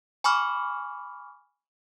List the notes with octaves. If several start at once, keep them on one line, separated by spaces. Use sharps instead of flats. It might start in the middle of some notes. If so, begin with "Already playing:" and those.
G#5 B5 C#6 D6 F6